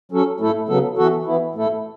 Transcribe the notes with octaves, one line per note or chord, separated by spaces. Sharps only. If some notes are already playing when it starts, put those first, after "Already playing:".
F#3 C#4 A4
A2 A3 E4 A4
C#3 F#3 B3 A4
E3 B3 F#4 A4
E3 B3 E4
A2 A3 E4 A4